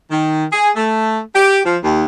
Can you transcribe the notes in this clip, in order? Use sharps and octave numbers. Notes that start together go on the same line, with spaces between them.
D#3
G#4
A3
G4
F3
D#2